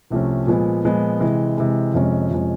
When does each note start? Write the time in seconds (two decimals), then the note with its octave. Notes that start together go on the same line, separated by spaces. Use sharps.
0.10 C2 C3 F3 A3 C#4
0.47 A#2 F3 G#3 B3
0.85 A#2 F3 G#3 B3
1.20 C3 E3 G#3
1.58 C3 E3 G#3
1.94 F2 C3 F3 G#3 C#4
2.31 F2 C3 F3 G#3 C#4